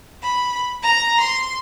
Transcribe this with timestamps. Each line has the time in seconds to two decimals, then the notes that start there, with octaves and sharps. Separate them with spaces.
0.22 B5
0.81 A#5
1.19 C6